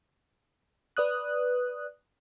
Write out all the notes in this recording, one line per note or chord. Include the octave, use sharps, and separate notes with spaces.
B4 D5 D#6 F#6